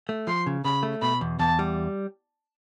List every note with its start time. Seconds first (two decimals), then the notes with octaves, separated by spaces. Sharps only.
0.09 A3
0.27 F3 C6
0.46 C#3
0.65 C#3 B5
0.83 A3
1.02 B2 B5
1.21 E2
1.39 E2 A5
1.59 G3